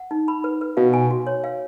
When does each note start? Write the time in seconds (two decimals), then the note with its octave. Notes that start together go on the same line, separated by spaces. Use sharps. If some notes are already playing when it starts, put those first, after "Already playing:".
Already playing: F#5
0.11 D#4
0.28 B5
0.44 B4
0.61 B4
0.77 B2 F5
0.94 G#5
1.11 F#4
1.27 C#5
1.44 F5